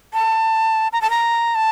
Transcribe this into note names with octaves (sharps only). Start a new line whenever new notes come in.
A5
A#5
A5
A#5
A5